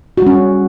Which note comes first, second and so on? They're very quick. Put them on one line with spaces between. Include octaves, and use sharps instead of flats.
F#4 G3 C#4